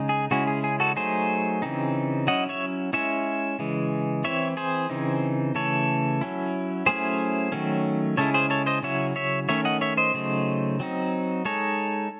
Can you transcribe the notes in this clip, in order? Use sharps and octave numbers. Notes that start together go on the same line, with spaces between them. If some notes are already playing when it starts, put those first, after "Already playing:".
Already playing: C#3 G#3 D#4
G#4
C#3 G#3 C#4 E4 F#4
G#4
G#4
F#4 A4
F#3 A3 D#4 G#4 C5
C#3 E3 C4 D#4
F#3 C#4 E4 D#5 F#5
C#5 E5
G#3 C#4 E4 C#5 E5
C#3 E3 G#3
E3 C4 E4 C#5 E5
G#4 C5
C#3 E3 C4 D#4
C#3 E3 A3 A4 C#5
F#3 C#4 E4
F#3 A3 C#4 E4 G#4 C5
D#3 F#3 A3 C#4
C#3 G#3 C#4 E4 A4 C#5
G#4 C5
A4 C#5
C5 D#5
C#3 F#3 C#4 E4 C#5 E5
C#5 E5
D#3 A3 C#4 C#5 E5
D#5 F#5
C#5 E5
C5 D#5
C#3 F#3 A3 D#4
F#3 C4 D#4
G#3 D#4 A4 C#5